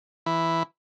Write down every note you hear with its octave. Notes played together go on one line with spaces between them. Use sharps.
E3 E4